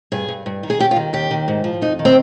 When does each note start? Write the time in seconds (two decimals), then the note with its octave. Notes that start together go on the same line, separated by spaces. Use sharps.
0.12 G2 G#4
0.28 G2
0.46 G2
0.63 D#3
0.70 G#4
0.80 D#2 G4
0.91 F4
0.96 D#3
1.13 D#2 G4
1.31 D#3
1.48 G#2
1.64 F3
1.81 F2 D#4
1.99 D#3
2.05 C4